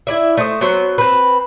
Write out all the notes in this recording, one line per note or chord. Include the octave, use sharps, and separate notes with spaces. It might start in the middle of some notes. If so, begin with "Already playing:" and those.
E4 D5 E5
A3 C5 D#5
F#3 B3 C5
C4 B4